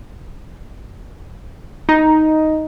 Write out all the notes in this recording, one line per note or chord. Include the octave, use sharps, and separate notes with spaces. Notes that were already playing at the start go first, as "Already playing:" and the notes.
D#4